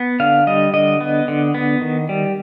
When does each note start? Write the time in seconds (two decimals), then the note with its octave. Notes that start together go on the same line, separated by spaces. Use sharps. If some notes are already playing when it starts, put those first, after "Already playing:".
Already playing: B3
0.20 D3 F5
0.47 G3 D#5
0.74 D3 D#5
1.01 B3
1.28 D3
1.54 B3
1.82 D#3
2.09 G3